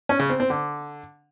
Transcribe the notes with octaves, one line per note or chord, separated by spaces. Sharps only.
C#4
C#3
C4
C4
D3